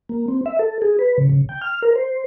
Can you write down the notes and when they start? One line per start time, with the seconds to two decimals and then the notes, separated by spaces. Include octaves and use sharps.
0.09 A#3
0.28 C4
0.46 E5
0.59 A4
0.82 G#4
0.99 B4
1.18 C#3
1.29 C#3
1.49 G5
1.61 F6
1.82 A#4
1.96 C5